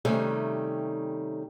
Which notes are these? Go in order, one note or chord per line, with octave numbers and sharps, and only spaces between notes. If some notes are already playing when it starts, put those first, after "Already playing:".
C3 D#3 G3 A3 C#4